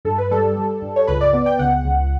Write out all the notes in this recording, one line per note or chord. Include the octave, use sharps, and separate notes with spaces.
G2 A4
B4
G3 A4
G3
G2
C#5
C#2 B4
D5
B3 D5
G5
C#2 F#5
C#2